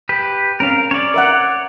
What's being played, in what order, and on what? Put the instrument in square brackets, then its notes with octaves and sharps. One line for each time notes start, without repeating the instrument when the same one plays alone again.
[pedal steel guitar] G4 B4
[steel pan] C4 C#4 [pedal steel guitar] A#4 F5
[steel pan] C#4 [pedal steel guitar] C#5 D5
[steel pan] A#4 E5 F#5